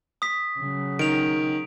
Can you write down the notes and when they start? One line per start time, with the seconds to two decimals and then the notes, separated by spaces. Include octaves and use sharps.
0.22 D#6 B6
0.60 C#3 F#3
0.99 D#3 D7 F7